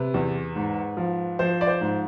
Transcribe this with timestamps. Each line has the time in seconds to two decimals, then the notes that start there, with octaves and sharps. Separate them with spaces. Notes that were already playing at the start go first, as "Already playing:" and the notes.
Already playing: C3 B4
0.14 E2
0.56 G#2
0.97 F3
1.39 F3 C5
1.61 D5
1.67 C5
1.81 G#2